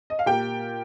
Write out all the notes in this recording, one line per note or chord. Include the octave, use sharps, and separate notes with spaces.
D#5
F5
A#2 A#3 G4 G5